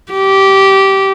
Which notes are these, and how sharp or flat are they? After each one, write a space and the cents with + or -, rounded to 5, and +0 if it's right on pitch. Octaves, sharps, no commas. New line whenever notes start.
G4 -15